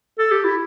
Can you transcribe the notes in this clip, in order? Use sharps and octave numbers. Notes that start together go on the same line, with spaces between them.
A4
G4
E4